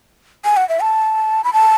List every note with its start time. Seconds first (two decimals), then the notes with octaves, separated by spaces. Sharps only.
0.45 G#5
0.57 F#5
0.69 E5
0.81 A5
1.44 B5
1.53 A5